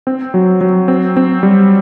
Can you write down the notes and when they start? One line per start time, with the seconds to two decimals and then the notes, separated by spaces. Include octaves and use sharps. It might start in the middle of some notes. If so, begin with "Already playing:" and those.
0.07 C4
0.34 F#3
0.61 F#3
0.88 C4
1.17 C4
1.43 G3